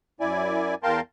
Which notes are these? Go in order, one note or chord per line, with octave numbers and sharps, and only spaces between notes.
F#2 E4 D5 G#5
E2 A#4 F5 G5 A5 C6